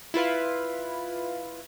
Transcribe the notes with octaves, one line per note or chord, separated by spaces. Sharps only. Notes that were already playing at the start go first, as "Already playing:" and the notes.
E4 F4 B4 F5